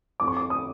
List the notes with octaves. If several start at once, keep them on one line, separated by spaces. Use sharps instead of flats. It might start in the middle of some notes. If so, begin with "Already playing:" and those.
F2 D6
C#6
D6
D#6